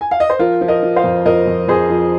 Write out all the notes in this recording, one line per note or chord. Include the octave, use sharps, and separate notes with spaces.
G#5
F5
D#5
C5
F3 F4 A#4
F3
A#4 D#5
F3
C5 F5
F2
F2 A#4 D#5
F2
F2 G#4 C5
F3